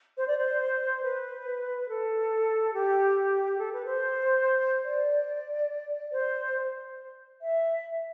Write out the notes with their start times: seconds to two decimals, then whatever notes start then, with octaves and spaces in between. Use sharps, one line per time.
0.16 C5
0.26 D5
0.35 C5
1.02 B4
1.87 A4
2.72 G4
3.57 A4
3.71 B4
3.85 C5
4.84 D5
6.12 C5
7.40 E5